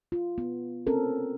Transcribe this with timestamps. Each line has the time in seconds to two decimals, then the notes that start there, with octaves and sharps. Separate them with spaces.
0.12 F4
0.38 B3
0.87 C4 C#4 A4 A#4